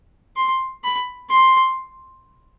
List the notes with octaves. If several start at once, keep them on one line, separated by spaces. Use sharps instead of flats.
C6
B5
C6